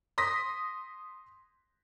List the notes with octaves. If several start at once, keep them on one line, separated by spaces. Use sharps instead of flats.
C6 D#6 A#6 B6